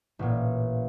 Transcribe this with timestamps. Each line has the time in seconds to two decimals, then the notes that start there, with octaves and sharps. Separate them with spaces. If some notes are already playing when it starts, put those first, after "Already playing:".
0.19 A1 A#2